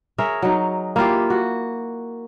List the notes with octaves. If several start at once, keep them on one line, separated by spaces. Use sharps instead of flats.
G#4 A#4 C#5 E5
F#3 D#4
A#3 E4 F4 G4
F#4